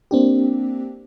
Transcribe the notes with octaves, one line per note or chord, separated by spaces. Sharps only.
A#3 C4 D4 G4